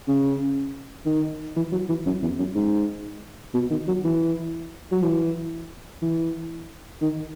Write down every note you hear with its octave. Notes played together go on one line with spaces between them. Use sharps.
C#3
D#3
E3
F#3
E3
F#2
E2
F#2
G#2
B2
D#3
F#3
E3
F#3
E3
E3
D#3